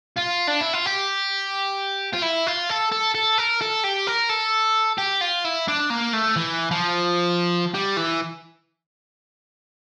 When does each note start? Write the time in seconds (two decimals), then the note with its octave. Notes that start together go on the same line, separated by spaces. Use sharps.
0.17 F4
0.47 D4
0.61 E4
0.73 F4
0.86 G4
2.14 F4
2.23 E4
2.47 F4
2.69 A4
2.92 A4
3.15 A4
3.38 A#4
3.62 A4
3.84 G4
4.07 A#4
4.29 A4
4.98 G4
5.21 F4
5.45 E4
5.68 D4
5.90 A#3
6.13 A3
6.36 E3
6.71 F3
7.74 G3
7.97 E3